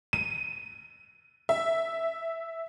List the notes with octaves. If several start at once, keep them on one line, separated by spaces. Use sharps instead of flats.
D#7
E5